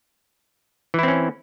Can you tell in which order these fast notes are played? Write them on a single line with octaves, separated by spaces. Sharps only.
E3 E4 C4 C#4